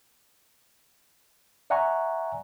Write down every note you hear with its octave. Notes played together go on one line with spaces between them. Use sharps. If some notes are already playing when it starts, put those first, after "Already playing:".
D5 E5 F#5 G#5 A#5 C#6